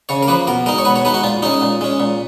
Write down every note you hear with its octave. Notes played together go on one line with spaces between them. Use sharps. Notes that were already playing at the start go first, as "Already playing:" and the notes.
C#3 C#5
A#4
F3 A#3 B4
B2 A#4
G#3 D#4 A#4
C#5
B2 B4
C#5
G#3 D#4 B4
F#4
A#2 F4
G#3 C#4 D#4
A#2
G#3 C#4
A#2